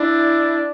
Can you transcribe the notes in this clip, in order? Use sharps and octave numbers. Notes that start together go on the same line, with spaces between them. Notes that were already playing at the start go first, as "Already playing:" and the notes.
Already playing: D4 E4